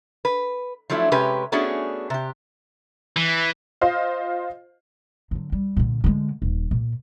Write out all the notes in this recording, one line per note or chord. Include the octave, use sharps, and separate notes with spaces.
B4
F3 F#3 A3 D4 E4
C3 G#3 C#4 G4 B4
A3 B3 C#4 D4 F#4 G#4
C3 G4
E3
F4 C5 D#5 F5
D3 F#3
G3
A#2 D3
D3 G#3
D#1
A#2